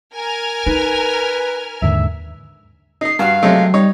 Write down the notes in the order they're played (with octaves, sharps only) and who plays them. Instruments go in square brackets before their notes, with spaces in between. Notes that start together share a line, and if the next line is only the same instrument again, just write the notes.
[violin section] A#4 G#5 F6
[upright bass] D#4 [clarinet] B4
[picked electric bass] D#2 G#2 D3 [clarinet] E5
[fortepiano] D#4 D#5 [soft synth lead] C7
[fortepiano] G2 F#4 [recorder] F5
[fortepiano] C3 G#3 A3 [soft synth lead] F#3
[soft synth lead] G3 [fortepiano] D#4 C#5